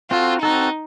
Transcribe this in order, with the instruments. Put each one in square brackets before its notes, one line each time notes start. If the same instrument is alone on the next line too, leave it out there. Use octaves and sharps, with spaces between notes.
[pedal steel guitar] C4 F#4 A4 [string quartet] F4
[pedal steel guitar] C4 F#4 A4 [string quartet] D#4